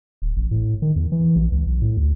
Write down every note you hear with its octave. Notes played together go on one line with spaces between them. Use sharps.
D1
A1
A2
D#3
E2
E3
A#1
C#2
B1
A2
D2